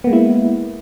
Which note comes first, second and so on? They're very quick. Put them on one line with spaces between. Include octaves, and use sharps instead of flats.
B3 A#3 G#3 E4